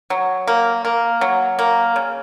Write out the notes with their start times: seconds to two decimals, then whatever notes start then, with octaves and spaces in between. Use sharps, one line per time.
0.10 F#3
0.47 A#3
0.85 A#3
1.21 F#3
1.59 A#3
1.96 C#3